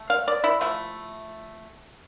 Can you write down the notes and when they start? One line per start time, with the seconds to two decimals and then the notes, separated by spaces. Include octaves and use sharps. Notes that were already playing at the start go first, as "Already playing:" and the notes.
Already playing: A3
0.10 F5
0.28 D5
0.44 E4
0.61 F3 A3 E4